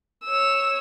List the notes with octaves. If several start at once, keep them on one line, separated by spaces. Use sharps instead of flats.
C#5 E6